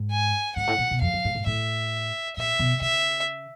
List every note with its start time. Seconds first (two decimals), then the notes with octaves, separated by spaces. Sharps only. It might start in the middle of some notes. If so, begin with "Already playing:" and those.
Already playing: G#2
0.11 G#5
0.56 G#2 F#5
0.67 A2
0.78 A#2
0.91 B2
1.01 F2 F5
1.13 F#2
1.25 G#2
1.35 G#2
1.46 A2 E5
2.36 A#2 E5
2.59 B2
2.81 C#3 E5